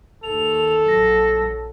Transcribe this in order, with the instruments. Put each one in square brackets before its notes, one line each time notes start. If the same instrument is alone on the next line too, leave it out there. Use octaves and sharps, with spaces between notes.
[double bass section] D#2 [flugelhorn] A4 [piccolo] F7
[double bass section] A#1 F#3 [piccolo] A#6